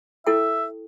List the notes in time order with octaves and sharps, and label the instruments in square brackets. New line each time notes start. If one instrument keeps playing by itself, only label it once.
[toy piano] E4 A4 G5 [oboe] E5